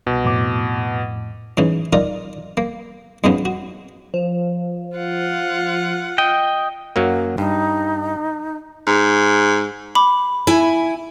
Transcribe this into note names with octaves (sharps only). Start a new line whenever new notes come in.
C2 B2
F2 A2 D6
G#2 E3 C#4
D#4 F4 A#4 D5
A#3
F2 G#2 F3 F#3 B3 C#4
F#4
F3
F4 F#5
D#5 G5
F#2 F#3 A#3
G2 D#4
G#2
B5 D6
E4 G#5